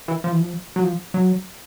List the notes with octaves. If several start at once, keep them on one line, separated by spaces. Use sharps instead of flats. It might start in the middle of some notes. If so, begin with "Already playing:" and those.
E3
F3
E3
F3
F#3
F3
F#3